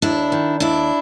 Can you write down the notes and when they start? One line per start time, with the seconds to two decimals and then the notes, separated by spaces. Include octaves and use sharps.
0.02 D#2 D4 E4
0.32 D#3
0.60 D#2 D4 E4